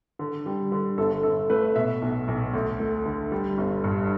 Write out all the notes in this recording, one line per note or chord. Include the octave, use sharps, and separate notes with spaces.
D3
G3
D3
G1 A4
G1 A4
A3 B4
B2 E5
B1
B1
D2
A3
D3
G3
G1
G2